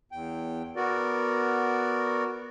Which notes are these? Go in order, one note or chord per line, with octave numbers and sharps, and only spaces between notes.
E2 G5
B3 F#4 A#4 D5